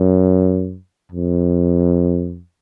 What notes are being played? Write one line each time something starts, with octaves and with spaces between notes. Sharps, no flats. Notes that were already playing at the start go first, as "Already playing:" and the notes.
Already playing: F#2
F2